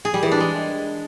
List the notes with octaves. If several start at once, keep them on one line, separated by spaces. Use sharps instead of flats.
G#4
G3
E3
D4
G#3